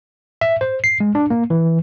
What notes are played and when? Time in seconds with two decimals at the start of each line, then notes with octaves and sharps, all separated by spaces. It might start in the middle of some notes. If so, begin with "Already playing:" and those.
0.41 E5
0.61 C5
0.84 C7
1.00 G#3
1.15 D4
1.30 A#3
1.50 E3